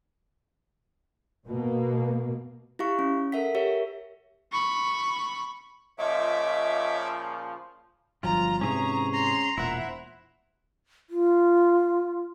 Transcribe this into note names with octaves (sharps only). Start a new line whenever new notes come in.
B2 A#3
E4 G4 F5 C#6
C#4
A4 A#4 E5 F#5 B6
G4 A#4 C#5 E5
B5 C#6
A#2 C#3 F3 C#5 D#5 E5 D6
G1 F3 F#3 F4 A#5
G#2 C3 E3 C#4 G#4 C#5 A#5
A#5 C6
E1 A#2 E4 C5 E5 F#5
F4